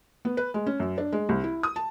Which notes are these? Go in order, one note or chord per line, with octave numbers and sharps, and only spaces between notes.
B3
B4
G#3
C#4
F#2
D4
G#3
C2
E4
D#6
A5